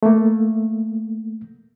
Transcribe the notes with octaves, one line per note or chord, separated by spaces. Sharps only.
A3 A#3